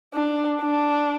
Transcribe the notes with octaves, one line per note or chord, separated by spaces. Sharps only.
D4
D4